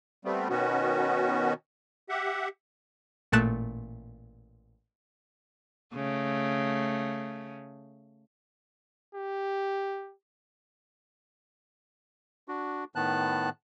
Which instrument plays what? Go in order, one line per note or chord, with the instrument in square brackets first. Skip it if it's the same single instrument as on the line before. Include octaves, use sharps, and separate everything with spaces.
[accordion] G3 A3 B3 C4
B2 D#3 B3 C#4 F#4
G4 E5 F#5
[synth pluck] A1 A#2 A3 A5 F#6 E7
[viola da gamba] C#3 A3
[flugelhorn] G4
[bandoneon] D4 F#4
A2 D#3 B3 A5 F#6